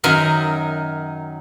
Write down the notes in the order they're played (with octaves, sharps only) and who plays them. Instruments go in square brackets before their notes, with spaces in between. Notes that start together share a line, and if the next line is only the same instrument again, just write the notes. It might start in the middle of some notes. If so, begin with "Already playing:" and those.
[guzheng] F#2 D#3 F#3 A#4